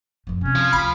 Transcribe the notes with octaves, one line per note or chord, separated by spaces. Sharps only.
F#2 F3
C3 C4 C#4
F3
D2 B5